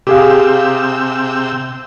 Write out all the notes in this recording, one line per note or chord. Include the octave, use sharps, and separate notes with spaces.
C3 G4 G#4 F5 G5 E6